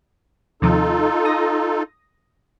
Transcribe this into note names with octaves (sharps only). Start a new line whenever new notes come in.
D#2 C3 F3 D#4 F4 A4
D#6 A#6